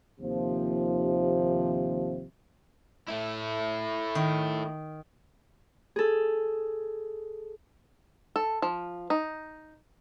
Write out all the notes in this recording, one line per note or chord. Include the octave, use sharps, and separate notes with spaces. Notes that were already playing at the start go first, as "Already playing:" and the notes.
D#2 C3 F3
A3 E4
D#3
G#4 A4
A4
F3
D#4